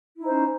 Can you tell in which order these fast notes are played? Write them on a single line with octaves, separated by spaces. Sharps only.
E4 D#4 C5 C#4